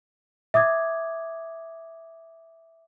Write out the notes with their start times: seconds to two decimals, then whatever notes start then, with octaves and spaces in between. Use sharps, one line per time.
0.54 E5 D6 D#6 G#6